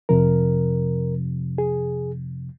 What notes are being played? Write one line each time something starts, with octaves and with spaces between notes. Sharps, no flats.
F2 C3 F3 A#4
G#4